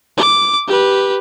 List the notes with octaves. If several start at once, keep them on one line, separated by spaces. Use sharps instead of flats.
D6
G4 B4